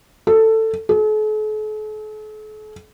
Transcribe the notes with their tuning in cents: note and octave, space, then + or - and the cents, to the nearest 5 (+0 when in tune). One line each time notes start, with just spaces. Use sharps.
A4 +15
A4 -45